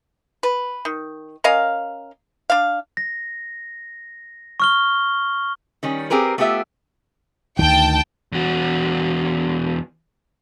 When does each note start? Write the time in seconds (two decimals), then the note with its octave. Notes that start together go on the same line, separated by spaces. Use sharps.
0.43 B4
0.85 D#3
1.44 C#4 A#4 D#5 F5
2.50 D4 F5
2.97 A#6
4.60 C#6 F6 G7
5.83 D#3 G3 C#4
6.10 C4 G4 G#4 A#4 B4
6.38 A3 B3 F4 G4 E5
7.59 D2 D#3 G5 A5
8.32 E2 F#4